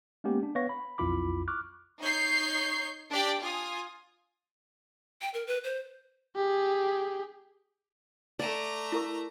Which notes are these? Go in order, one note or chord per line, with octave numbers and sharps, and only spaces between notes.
G#3 A#3 B3 C#4 G4
D4
B3 B4 C#5 F5 C#6 A#6
B5
B1 F2 E4 F4 B5 D6
C#6 D6 F6 F#6
D#4 C#5 G6 C7
D4 G4 D5 G5
F4 G#5 D#6
G5
A#4
B4
C5
G4 G#4
A3 D5 A#5
E4 A#4 C#6